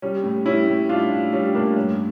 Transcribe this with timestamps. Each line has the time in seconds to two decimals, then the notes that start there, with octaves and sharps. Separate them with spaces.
0.02 G3 C#4
0.24 A2
0.46 G3 C#4 E4
0.68 A2
0.89 G3 D4 F4
1.11 A2
1.33 G3 C#4
1.55 A2 A#3 D4
1.76 G2 C#4